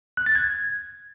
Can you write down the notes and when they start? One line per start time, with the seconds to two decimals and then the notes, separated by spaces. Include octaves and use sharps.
0.17 F#6
0.26 A6
0.35 G#6